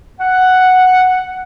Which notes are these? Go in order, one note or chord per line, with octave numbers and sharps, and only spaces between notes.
F#5